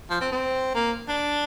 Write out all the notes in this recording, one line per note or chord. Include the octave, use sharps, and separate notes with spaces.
F3
C4
C4
A#3
D4